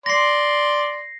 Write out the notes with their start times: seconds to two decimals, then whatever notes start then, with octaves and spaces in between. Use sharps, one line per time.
0.06 D5 C6 A#6 C7